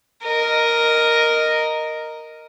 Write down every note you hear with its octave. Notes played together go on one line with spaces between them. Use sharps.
A#4 D#5